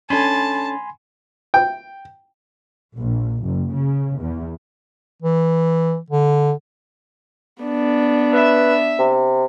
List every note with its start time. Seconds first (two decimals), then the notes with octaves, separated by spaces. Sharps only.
0.10 C#4 D4 A4 G#5 A5 B5 C6
1.54 G5
2.95 A#1
3.43 F#1
3.73 C#3
4.19 E2
5.22 E3
6.10 D3
7.62 B3 D4
8.33 B4 E5
8.99 C3